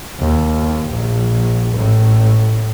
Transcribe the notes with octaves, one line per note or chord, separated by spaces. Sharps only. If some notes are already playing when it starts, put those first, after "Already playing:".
D#2
A#1
A1 A2